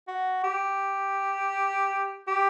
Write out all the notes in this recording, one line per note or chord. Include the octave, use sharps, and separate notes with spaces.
F#4
G4
G4